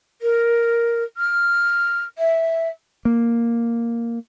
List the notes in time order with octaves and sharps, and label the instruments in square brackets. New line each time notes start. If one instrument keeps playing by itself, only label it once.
[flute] A#4
F6
E5
[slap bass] A#3